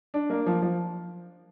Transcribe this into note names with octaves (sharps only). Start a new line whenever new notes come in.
D4
A#3
F3
F3